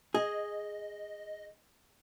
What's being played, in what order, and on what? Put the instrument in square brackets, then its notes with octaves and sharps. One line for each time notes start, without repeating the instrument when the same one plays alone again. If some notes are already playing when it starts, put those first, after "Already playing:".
[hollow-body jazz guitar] G#4 [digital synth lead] D#5